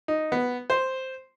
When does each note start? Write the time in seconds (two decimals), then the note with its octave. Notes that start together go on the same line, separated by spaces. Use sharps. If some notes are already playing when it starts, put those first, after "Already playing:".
0.08 D#4
0.32 B3
0.70 C5